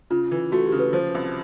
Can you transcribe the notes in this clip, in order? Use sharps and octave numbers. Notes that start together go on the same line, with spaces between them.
C#3 F4
E3
A3 F#4
G4
C#3
B4
F3 C5
C2